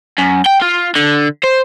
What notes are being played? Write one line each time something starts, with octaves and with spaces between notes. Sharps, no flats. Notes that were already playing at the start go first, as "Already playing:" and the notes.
F#2
G5
F4
D3
C5